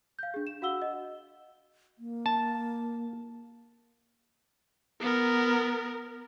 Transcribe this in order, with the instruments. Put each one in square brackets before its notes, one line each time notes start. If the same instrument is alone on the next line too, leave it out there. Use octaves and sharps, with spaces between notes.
[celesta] F5 G6
D4 G#4
E7
F#4 F5 F#5 E6 G7
D#5
[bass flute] A#3
[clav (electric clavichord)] A5
[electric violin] B3 A#4